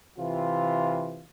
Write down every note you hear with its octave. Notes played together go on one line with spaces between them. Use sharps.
C3 E3 F4